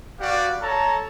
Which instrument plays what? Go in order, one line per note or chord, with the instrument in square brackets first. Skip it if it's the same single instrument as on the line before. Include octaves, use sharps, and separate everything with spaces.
[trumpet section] F#4 G4 B4 D5 F5
A4 C#5 A5 A#5